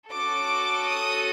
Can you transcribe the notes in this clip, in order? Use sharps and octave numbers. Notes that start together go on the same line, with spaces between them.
C#4 F#4 A4 D6
D#6